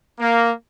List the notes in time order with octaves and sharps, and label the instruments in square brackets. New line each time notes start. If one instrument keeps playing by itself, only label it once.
[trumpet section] A#3